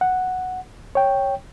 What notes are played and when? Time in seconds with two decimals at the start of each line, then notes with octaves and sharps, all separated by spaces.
0.01 F#5
0.95 C#5 G5